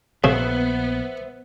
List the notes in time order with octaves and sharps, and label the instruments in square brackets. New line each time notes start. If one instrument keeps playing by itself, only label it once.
[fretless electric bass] A#1 [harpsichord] C#3 [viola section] B3 [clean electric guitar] B4 C5 E5